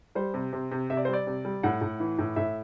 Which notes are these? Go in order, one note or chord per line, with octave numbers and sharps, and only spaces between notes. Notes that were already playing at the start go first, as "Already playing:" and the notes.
G3 C5
C3
C3
C3
C3 E5
D5
C5
G3
D5
C3
G3
A2 F#5
A2
E3
A2
A2 E5